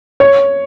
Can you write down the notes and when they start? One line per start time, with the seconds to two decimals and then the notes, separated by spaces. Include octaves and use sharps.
0.20 C#5